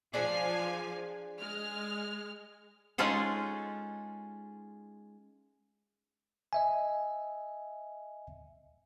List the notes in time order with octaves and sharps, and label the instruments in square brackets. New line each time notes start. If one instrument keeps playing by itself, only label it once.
[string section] F3 F5 G#5 [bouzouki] D4 G#4 C5
[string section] G#3 F6
[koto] G#3 C#4 D#4 F4 G#4 A4
[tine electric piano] D#5 E5 G#5